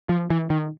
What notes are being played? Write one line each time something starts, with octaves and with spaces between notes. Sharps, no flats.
F3
E3
D#3